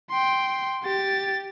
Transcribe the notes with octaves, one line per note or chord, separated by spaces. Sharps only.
G5 C6
G4 A6